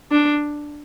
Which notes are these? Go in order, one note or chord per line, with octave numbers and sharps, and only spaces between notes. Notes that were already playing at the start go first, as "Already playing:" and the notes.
D4